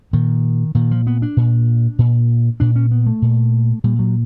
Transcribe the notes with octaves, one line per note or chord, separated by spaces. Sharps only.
A#2 D#3
A#2 D#3
F3
B3
D4
A#2
A#2
A#2 D4
C#4
B3
A3
A#2
A#2 G3
F#3